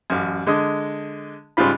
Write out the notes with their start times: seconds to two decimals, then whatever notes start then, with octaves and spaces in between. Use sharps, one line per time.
0.10 A1 F#2
0.47 D3 G#3 D#5 D#6
1.57 G#2 C#3 G3 F4 B5